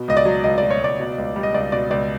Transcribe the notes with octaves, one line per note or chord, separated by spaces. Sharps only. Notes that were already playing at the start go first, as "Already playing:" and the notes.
Already playing: B2
C#2 D#5
D5
F#3
C#2 D#5
B2 D5
C#5
C#2 D5
B2
C#2
G3
D#5
C#2 D5
B2 D5
C#2 D5